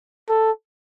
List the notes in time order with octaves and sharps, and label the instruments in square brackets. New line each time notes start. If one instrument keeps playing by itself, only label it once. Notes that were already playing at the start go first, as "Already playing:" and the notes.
[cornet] A4